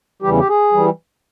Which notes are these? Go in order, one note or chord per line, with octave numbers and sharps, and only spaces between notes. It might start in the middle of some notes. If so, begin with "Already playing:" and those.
E2 C#3 E3 G3 G4
G4
G#4
E3 G3